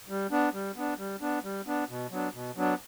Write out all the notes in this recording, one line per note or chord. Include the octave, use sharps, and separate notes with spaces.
G3
B3 D4
G3
B3 D4
G3
B3 D4
G3
B3 D4
B2
F#3 B3 D4
B2
F#3 B3 D4